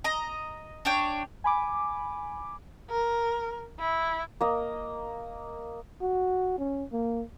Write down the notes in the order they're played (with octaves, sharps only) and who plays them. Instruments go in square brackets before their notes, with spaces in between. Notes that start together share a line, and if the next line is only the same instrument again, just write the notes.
[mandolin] D#5 A#5
D4 C#5 G5
[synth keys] G#5 B5 D6
[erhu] A#4
E4
[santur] A#3 D#5
[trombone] F#4
C#4
A#3